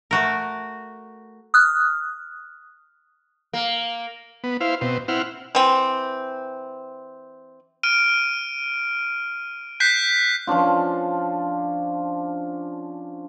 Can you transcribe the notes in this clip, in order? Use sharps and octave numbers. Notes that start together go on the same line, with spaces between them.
A3 F#4 A#4
D#6 F6 F#6
A#3
B3
E4 C5 F5
B2 C4
C4 E4 F#5 F6
E3 C4
F6 D7 D#7
F#6 G6 B6 C7
F3 C#4 D4 F4